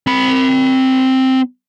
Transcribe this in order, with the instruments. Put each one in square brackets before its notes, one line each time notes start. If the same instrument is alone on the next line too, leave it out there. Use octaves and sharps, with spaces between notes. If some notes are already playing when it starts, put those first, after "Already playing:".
[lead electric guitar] C4 B5